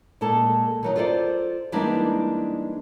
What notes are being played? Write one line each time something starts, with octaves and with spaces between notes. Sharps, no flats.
A#2 G#3 A4 A5
D#3 F#3 D#4
F4 A4 C5 D5
E3 G3 G#3 A#3 D4 D#4